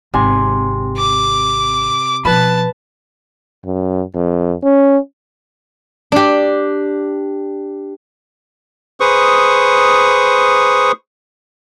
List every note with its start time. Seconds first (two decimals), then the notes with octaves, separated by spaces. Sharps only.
0.14 G#1 C3 G#5 C6
0.97 D6
2.25 B2 F3 B4 A5 B5
3.65 F#2
4.15 F2
4.64 C#4
6.12 D4 G4
9.00 G#4 B4 C5 C#6 D#6